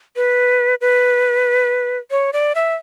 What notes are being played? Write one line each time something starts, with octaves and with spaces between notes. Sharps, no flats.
B4
B4
C#5
D5
E5